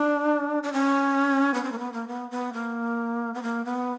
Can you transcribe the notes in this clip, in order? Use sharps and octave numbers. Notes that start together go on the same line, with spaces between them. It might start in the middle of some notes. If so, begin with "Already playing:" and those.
Already playing: D4
D4
C#4
B3
C4
A#3
B3
A#3
B3
B3
A#3
B3
A#3
B3